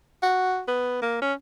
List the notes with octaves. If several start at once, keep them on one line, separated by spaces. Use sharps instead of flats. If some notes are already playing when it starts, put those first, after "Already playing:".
F#4
B3
A#3
C#4